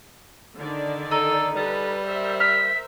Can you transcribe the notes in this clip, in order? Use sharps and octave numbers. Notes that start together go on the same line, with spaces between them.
D3 D#3 D5
D#4 A4
G3 A4 B4
A#4 C5 E5
F6 B6